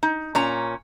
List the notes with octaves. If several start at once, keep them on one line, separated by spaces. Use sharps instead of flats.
D#4
A#2 C#4 A#5